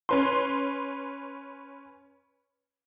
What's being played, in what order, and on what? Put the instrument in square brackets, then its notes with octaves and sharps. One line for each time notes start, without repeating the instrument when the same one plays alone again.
[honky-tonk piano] C#4 B4 C6